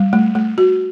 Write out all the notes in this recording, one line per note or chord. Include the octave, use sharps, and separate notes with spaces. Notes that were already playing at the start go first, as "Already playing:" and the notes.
Already playing: G3
A3
A3
F#4